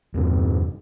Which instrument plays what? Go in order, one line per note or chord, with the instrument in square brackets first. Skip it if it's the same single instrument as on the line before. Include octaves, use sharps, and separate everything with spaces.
[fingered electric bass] E2 G2 C3